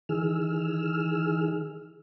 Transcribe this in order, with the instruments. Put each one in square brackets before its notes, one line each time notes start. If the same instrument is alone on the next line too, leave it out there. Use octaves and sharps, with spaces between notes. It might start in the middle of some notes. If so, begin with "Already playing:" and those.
[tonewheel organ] D#3 E3 G#4 E6 F6